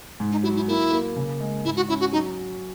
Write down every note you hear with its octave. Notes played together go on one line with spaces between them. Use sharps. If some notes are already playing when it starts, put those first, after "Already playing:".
G#2
D#4
F#3 E4
E4
A#3 E4
A#3
C#3
G#3
G#2 E4
F#4
C#4 E4
F#4
F#3 D#4